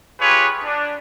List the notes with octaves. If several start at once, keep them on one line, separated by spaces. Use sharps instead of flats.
F4 G4 G#4 B4 C#5
D4